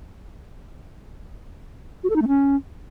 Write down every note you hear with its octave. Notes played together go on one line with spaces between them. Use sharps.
F#4
A4
D#4
A3
C#4